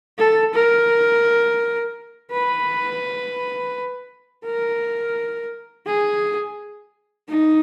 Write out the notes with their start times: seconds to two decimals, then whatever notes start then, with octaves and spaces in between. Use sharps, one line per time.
0.19 A4
0.54 A#4
2.32 B4
4.45 A#4
5.87 G#4
7.29 D#4